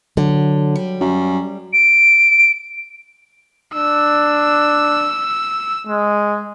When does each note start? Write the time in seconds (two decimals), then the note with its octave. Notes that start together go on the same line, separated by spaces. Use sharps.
0.17 D3 F#3
0.76 G3
1.01 F#2
1.73 D7
3.74 D4 E6
5.87 G#3